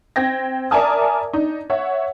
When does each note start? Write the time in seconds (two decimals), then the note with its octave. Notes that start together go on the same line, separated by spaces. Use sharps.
0.16 C4 G5 G#6 A#6
0.71 A#4 D5 E5 G#5 A5 D#6
1.33 D4 D#4
1.70 C#5 E5 F#5